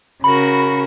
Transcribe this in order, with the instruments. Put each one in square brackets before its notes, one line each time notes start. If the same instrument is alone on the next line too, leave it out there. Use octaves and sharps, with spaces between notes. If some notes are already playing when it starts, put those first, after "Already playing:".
[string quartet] C#3 F#4 A#4 [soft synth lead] B5